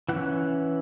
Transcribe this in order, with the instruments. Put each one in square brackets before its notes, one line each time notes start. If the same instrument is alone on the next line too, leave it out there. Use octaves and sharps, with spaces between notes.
[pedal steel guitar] E3 C#4 F#5